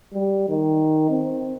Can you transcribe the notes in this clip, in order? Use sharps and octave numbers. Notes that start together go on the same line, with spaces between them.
G3
D#3
C4